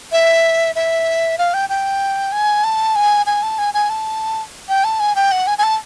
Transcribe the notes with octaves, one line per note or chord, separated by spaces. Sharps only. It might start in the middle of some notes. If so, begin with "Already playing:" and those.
E5
E5
F5
G5
G5
G#5
A5
G#5
G#5
A5
G#5
G#5
A5
G5
A5
G#5
G5
F#5
G#5
G#5
A5